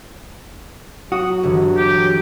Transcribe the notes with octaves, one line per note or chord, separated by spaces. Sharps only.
F#3 F#4 D#6
G1 D3 E3
G4